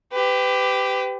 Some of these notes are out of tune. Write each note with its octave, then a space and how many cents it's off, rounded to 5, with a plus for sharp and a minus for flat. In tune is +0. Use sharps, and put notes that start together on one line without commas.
G4 +0 B4 +35